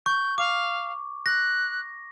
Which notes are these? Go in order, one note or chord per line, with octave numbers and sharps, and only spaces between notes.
C#6 G6
F5 D6
F#6 A#6